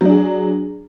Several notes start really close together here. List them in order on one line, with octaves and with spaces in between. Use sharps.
F#3 D4 G#4